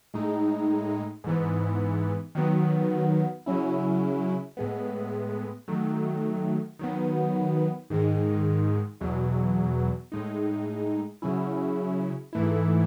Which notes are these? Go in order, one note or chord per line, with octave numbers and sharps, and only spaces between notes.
A2 G#3 D#4
G#2 E3 B3
D#3 F#3 B3
C#3 F#3 C#4 E4
A2 G#3 B3
D#3 F#3 A3
D#3 F#3 B3
G#2 D#3 G#3
E2 B2 F#3
A2 G#3 D#4
C#3 F#3 C#4 E4
G#2 E3 A3 E4